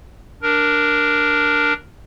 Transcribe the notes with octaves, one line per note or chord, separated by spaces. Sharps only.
D4 A#4